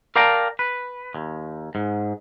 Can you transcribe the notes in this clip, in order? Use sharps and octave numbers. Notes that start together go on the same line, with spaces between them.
A#4 D5 F5 G5 A5 A#5
B4
D#2
G#2